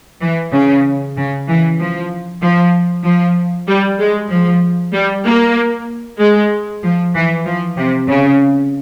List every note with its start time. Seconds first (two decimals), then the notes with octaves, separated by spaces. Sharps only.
0.22 E3
0.53 C#3
1.16 C#3
1.48 E3
1.79 F3
2.41 F3
3.04 F3
3.68 G3
3.99 G#3
4.30 F3
4.93 G3
5.25 A#3
6.19 G#3
6.83 F3
7.14 E3
7.46 F3
7.77 C3
8.08 C#3